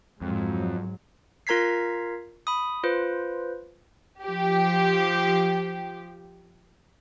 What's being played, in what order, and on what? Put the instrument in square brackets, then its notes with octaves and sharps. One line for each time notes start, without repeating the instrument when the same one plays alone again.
[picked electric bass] F2 [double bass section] G#2 F#3 G#3
[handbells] F4 A#4 A#5 G#6 B6 C7
B5 D#6
F4 B4 C5
[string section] F3 G4